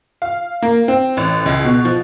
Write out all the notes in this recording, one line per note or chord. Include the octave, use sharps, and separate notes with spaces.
F5
A#3
C4
A1
C#2
B2
F3